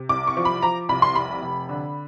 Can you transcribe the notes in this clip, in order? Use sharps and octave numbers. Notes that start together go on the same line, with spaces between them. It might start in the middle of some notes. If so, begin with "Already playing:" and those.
Already playing: C3
C2 D6
C#6
F3
B5
F3 A#5
C2 B5
C6
F1 B5
F1
D3